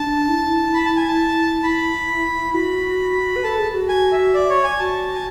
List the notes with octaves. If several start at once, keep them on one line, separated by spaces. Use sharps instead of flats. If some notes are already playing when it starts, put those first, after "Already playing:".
Already playing: D4 A5
E4
B5
A5
G#5
A5
E4 B5
F#4 B5
B4
A4 A5
G#4
F#4
G#5
E5
D5
C#5
G#5
F#4 A5
G#5